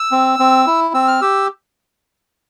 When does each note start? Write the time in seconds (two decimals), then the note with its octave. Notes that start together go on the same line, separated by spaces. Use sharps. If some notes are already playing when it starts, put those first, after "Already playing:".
Already playing: E6
0.12 C4
0.39 C4
0.67 E4
0.94 C4 E6
1.08 F6
1.21 G4 E6